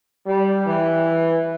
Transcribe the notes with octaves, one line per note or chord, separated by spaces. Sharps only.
G3
E3